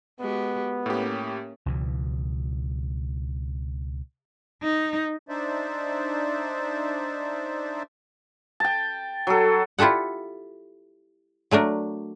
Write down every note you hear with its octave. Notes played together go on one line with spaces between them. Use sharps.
G#3 B3 F#4 G4
A2 A#3 C#4 G4
C#2 B2 E3
D#4
D4 D#4 C5 D5 E5
G5 A5
F#3 A4
E4 F4 G4 A4 F#5
F#3 A3 D4 A#4